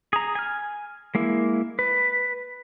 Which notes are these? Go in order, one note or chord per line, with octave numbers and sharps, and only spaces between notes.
G#4 A#5
G#5 F6
G#3 A#3 E4
B4